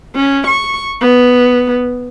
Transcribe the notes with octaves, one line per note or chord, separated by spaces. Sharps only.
C#4
C#6
B3